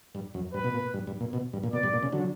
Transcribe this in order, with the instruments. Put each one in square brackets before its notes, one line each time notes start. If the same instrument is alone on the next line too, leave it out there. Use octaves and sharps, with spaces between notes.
[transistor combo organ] G2
F#2
[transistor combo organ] G2 [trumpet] B4
[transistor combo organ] B2
A#2
G2
G2
A#2
B2
G2
A#2
[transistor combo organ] B2 [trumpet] D5
[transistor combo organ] G2
A#2
C#3
D3 F#3